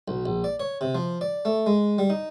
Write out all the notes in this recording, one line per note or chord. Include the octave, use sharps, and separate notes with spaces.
B1
A#1
D5
C#5
C3
F3
D5
A3
G#3
G3
D#4